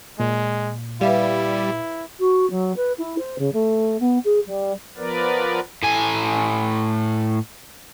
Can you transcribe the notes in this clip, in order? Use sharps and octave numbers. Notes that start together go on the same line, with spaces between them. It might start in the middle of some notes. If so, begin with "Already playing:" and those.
A#2 G#3
G3 E4 B4 E5 F5
F#4
F#3
B4
E4
C5
C#3
A3
B3
G#4
G3
F3 B3 A#4 B4 D5
A2 G#5